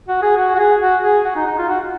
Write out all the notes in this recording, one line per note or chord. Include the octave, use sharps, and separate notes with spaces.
F#4
G#4
F#4
F#4
G#4
F#4
G#4
F#4
D#4
D#4
F4
F#4